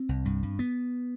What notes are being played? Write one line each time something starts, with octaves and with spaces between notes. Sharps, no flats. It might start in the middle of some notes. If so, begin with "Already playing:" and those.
Already playing: C4
C2
G2
G2
B3